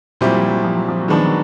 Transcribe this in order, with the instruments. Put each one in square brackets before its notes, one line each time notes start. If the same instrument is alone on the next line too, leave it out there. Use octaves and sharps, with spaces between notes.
[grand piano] A#2 G3 C4 E4 G4 [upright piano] F#3
[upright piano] F3
F#3
F3
F#3
F3
F#3
[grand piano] D#3 G#3 B3 D4 [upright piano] F3
[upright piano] F#3